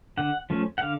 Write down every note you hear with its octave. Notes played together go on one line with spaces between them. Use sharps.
D3 F#5
F3 A3 C#4
F#5
D3 F5